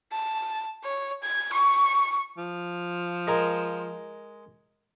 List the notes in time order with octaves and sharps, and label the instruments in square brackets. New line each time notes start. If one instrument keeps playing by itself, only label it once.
[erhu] A5
C#5
G#6
C#6
[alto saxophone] F3
[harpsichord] G#3 A#4